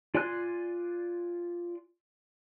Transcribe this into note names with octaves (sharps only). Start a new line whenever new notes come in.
F4 D5 G#5 C6 F#6